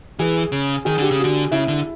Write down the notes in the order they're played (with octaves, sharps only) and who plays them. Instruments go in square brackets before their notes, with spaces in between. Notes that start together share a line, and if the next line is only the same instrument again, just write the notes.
[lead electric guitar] E3 [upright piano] G#4
[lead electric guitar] C#3
[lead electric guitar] D#3 [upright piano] G#4
[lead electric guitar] D3 [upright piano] G4
[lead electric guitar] C#3
[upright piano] F#4
[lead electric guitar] D3
[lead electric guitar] C#3 [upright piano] E4
[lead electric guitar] D3